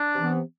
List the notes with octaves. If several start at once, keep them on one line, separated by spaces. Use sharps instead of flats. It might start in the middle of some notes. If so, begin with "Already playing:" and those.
Already playing: D4
C3 E3 B3